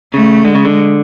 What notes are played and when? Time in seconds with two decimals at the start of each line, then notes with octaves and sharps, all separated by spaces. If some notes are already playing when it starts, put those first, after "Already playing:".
0.14 C#3 A3
0.45 D3 G#3
0.55 C#3
0.65 D3